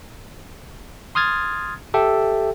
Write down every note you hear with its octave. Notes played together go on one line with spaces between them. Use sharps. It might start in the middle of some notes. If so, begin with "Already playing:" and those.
C6 D#6 F6 G#6 A6
G4 A4 E5 G5